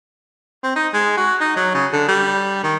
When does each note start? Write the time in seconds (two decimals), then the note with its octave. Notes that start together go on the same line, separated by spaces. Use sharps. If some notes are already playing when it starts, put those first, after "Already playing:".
0.63 C4
0.76 D#4
0.94 G#3
1.17 F#4
1.41 D#4
1.57 F#3
1.75 C#3
1.93 D3
2.08 G3
2.64 D#3